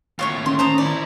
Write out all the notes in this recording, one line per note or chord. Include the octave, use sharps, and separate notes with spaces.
D#2 A2 F4 C#5 C#6
D#3 C#4 C6
C5 A5 A#5 D#6
D#4 E4 D5